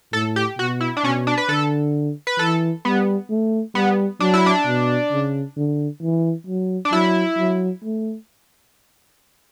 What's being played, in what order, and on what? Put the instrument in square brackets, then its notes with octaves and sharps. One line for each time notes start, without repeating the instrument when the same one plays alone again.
[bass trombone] A2 [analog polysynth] A4
[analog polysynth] G4
[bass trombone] B2 [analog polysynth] F#4
[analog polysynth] E4
D4
[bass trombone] B2 [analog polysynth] C#4
[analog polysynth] D4
B4
[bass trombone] D3 [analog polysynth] A4
[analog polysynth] B4
[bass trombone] E3 [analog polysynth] A4
[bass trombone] G3 [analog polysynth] B3
[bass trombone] A3
[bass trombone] G3 [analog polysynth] B3
[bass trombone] F#3 [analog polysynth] D4
[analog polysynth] E4
D4
[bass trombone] B2
C#3
D3
E3
F#3
[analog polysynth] D4
[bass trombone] F#3 [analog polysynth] E4
[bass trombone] F#3
A3